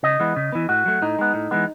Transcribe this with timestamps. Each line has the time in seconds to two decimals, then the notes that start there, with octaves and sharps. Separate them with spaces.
0.03 C#3 D#5
0.20 E3 G#3 B3
0.36 C#3
0.52 E3 B3
0.69 A2 F#4
0.86 F#3 A3
1.02 A2 D#4
1.19 G#3 B3
1.34 A2
1.51 E3 G#3 B3